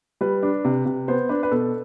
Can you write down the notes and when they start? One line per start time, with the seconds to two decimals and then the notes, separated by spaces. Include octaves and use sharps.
0.21 G3 B4
0.43 D4
0.65 C3
0.86 C3
1.08 B3 C5
1.29 D4 B4
1.43 B4
1.51 B2 A4